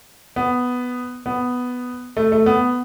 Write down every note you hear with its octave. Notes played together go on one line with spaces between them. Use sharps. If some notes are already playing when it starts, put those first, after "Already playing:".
B3
B3
A3
A3
B3